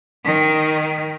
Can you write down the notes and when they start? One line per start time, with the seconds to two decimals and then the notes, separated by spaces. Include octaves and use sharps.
0.25 D#3